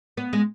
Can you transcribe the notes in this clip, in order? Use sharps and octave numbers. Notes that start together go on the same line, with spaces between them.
B3
G#3